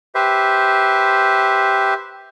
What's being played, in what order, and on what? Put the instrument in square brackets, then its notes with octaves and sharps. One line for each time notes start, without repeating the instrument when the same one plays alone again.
[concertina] G4 B4 C5 E5